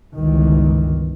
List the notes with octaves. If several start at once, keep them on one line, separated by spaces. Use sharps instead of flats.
G1 C#2 D#3 E3